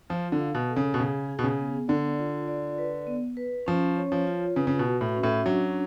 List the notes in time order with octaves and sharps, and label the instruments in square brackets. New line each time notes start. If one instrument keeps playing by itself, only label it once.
[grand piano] F3 [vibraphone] F4
[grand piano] D3
[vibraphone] F5
[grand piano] B2
[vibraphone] A4
[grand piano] C#3
B2
[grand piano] C#3 [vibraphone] G#4
[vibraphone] G#4
[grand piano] B2
C#3
[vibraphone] B3
[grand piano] D3 [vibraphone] D5
[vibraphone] F4
D5
B4
B3
B4
[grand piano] F3 [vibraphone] C#4
[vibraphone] C#5
[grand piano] F3
[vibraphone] F4
[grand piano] C#3 [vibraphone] B4
[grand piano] C#3
B2
[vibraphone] F#4
[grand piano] A2
[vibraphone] C#4
[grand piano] A2
[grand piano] F#3 [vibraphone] D4